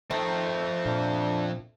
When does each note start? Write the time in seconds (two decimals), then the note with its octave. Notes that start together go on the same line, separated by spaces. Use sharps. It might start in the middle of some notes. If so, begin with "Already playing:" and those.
0.11 D#3 F3 A3 C4
0.86 A#2 D4